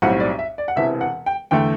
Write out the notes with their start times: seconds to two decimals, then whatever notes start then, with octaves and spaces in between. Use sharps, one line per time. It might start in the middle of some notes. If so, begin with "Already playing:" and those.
0.02 B1 A2 G3 C4 F#5
0.20 D5
0.39 E5
0.58 D5
0.68 F#5
0.76 E1 E2 C3 E3 E5
1.01 F#5
1.26 G5
1.51 E2 D3 A3 G5